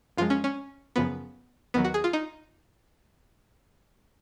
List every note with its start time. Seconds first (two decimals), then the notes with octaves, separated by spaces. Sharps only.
0.17 F#2 F3 G#3 F4
0.30 C#4
0.44 C#4
0.96 F#2 C#3 F3 B3
1.74 D#2 D#3 F#3 B3
1.85 F#4
1.94 G#4
2.04 F4
2.13 D#4